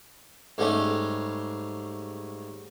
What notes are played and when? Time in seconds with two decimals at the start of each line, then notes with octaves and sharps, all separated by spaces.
0.58 G#2 G3 A3 C#4